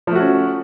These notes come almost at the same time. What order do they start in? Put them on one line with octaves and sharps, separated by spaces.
F3 A3 F#4 C#4